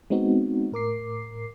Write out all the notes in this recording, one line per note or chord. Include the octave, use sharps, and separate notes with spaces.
G#3 B3 C4 D#4 F#4
A2 A#4 D6 C7